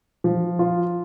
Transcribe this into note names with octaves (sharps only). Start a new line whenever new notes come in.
F3
F4